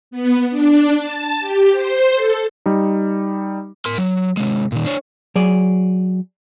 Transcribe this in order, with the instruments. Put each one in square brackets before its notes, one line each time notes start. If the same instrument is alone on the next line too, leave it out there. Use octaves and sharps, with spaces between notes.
[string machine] B3
D4
A5
G4
C5
A4
[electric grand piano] G3 D#4
[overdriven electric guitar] A#4 C6
F#3
C3 G#3
A#2 D#3
D4 C#5
[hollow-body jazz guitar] F#3 G#4 D5